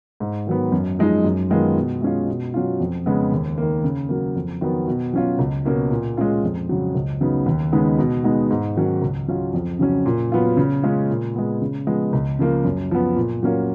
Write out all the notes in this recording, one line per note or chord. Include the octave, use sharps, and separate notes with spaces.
G#2
D#3 F#3 B3
F#2
F3 G#3 D#4
F#2
D#3 G#3 B3 F4
B2
G#3 C#4 F4
B2
F#3 C#4 F4
F2
C#3 G#3 B3
D#2
D#3 A#3
C#3
F#3 A#3
F2
D#3 F#3 B3
B2
F#3 C#4 F4
C#2
B2 A#3 C#4
A#2
G#3 C#4 F4
F2
C#3 F#3
C#2
C#3 F#3 B3 D#4
D#2
C#3 G#3 B3 D#4
B2
G#3 B3 D#4
G#2
D#3 F#3 C#4
C#2
C#3 F#3 C#4 F4
F2
C#3 F#3 C#4
A#2
F#3 B3 F4
C#3
G#3 C#4 F4
A#2
G#3 B3
C#3
F3 G#3 B3
C#2
C#3 F3 A#3 F4
F#2
F3 B3
A#2
F#3 A#3 C#4 F4